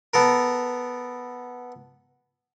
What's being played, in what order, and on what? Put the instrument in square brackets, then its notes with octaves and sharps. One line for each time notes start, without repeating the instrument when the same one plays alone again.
[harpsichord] B3 A4 A#4